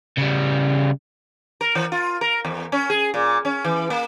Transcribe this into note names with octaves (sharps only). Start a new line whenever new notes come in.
C#3 G3
A#4
E3
F4
A#4
E2
C#4
G#4
A#2
C#4
E3
A#3